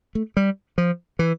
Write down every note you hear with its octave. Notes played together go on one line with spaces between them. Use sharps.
A3
G3
F3
E3